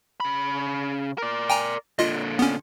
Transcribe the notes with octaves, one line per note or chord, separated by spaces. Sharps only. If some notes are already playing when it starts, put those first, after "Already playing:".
C#3 B5
A#4 D5
G5 G#5 A#5
A#2 D3 F4 D#5
B3 C#4